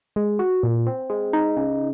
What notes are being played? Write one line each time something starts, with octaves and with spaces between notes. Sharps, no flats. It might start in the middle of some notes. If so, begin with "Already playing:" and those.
G#3
F#4
A#2
C4
G#3
D#4
C#3